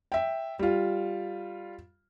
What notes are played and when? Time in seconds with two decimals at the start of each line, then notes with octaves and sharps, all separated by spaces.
0.12 E5 G5
0.59 G3 F4